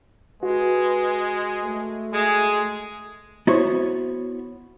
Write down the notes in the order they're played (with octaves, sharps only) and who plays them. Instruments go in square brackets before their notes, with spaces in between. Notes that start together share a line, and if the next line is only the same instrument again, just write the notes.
[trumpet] G#3 [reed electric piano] F#4 [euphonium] B4
[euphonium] A3
[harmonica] G#3 [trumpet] G#4
[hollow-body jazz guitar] B3 E4 F#4 C5 C#5